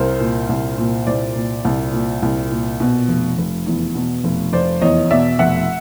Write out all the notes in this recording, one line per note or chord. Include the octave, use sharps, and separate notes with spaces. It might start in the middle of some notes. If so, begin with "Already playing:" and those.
Already playing: C2 A#4 C5
A#2
C2
A#2
C2 C5 D5
A#2
C2
A#2
C2
A#2
B2
F1
F1
E2
B2
F1
F1 C5 D5
E2 C#5 D#5
B2 D5 E5
F1 E5 F#5